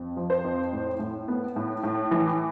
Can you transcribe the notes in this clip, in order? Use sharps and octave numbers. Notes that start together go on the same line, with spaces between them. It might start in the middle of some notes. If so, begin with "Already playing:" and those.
Already playing: F2
F3
C5
F2
A2
A2
B3
A2
A2
E3